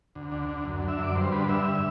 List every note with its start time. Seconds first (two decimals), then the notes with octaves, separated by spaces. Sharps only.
0.15 D2
0.32 D3
0.49 D2
0.65 F#2
0.82 D3
0.88 E5
0.99 F#2 D5
1.15 G2 C5
1.32 D3 B4
1.48 G2 E5